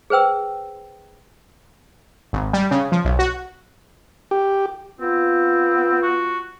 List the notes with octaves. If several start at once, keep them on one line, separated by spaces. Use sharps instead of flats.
G#4 B4 C5 G5 E6
G#1
G3
C#3
F3
B1
F#4
G4
B3 C4 F4
F#4